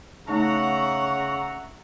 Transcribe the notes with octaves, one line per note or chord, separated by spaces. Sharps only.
C#3 A3 D#4 E5 F#5 A5 A#5 C#6